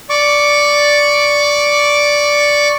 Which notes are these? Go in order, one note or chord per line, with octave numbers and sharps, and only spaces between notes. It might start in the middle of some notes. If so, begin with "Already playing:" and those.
D5 C#6 D6